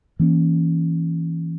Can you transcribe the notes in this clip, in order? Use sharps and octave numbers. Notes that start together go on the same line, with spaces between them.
E3 A#3 C#4